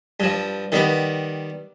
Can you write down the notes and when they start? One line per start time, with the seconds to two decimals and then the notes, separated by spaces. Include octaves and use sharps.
0.20 G2 F3
0.72 D#3 G3 B3